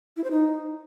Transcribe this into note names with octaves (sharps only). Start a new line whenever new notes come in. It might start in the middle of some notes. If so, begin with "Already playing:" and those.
E4
C5
D#4